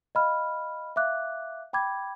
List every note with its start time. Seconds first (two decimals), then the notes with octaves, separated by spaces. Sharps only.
0.15 D#5 F5 B5 F6
0.96 E5 F5 D6 F#6
1.73 G5 B5 D6 G#6